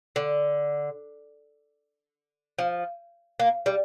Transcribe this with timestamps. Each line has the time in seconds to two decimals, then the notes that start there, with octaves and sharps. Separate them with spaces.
0.16 D3
2.58 F3
3.40 A#3
3.66 G3